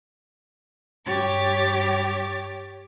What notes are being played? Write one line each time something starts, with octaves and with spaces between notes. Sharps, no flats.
G2 G4 C#5 D6 A6